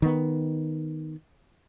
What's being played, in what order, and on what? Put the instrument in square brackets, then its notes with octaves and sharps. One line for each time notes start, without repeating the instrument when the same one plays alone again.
[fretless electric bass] D#3 B3